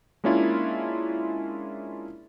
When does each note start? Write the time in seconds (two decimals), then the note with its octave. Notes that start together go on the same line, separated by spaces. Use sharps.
0.24 G#3 A#3 C#4 D4 E4 F4